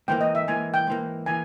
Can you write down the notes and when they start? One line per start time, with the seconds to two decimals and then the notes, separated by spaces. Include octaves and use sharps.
0.08 G#2 E3 A#3 G5
0.21 D#5
0.35 E5
0.48 G#2 E3 A#3 G#5
0.74 G5
0.87 G#2 E3 A#3
1.26 E3 A#3 G#5